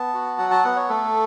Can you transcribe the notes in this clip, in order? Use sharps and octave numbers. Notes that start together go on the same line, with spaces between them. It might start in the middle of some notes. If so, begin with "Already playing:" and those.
Already playing: B3 A5
F#4
F#3 F#5
A5
B3 F#5
C#5
A3 A4